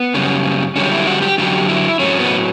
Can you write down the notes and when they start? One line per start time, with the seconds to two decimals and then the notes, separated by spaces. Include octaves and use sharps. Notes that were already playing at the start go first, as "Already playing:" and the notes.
Already playing: B3
0.14 F#2 C#3 G3
0.75 F#2 D3 G3 C#4
0.92 E4
1.07 F#4
1.22 G4
1.38 F#2 D3 F#3 G4
1.68 E4
1.99 A2 F#3 C#4
2.20 B3